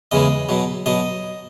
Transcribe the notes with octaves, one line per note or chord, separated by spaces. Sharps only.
E2 C#3 E3 G#3 D#5
B2 F#3
B2 F#3 D#5